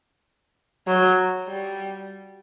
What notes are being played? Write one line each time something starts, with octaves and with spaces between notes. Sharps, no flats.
F#3
G3